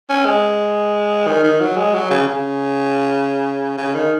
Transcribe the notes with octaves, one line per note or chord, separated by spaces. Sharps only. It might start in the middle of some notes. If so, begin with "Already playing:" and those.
C#4
G#3
D#3
D#3
F#3
G#3
F#3
C#3
C#3
C#3
D#3